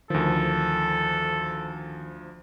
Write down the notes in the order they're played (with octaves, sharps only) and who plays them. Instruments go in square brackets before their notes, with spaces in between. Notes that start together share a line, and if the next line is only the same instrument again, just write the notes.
[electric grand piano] D2 F3 [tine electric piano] D#3 [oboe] A4